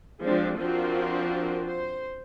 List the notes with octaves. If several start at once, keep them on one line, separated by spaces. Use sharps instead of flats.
F3 G#3 C4 D4 G4
F3 C4 D4 F4 F#4 A#4
C5